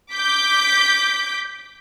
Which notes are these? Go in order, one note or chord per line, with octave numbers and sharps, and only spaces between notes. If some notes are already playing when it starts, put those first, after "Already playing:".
D6 G6 B6